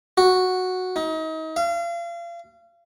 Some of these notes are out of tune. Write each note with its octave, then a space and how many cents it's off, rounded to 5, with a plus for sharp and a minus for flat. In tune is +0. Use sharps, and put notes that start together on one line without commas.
F#4 -5
D#4 +35
F5 -35